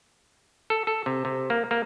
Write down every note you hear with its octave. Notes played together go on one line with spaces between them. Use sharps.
A4
A4
C3
C3
A#3
A#3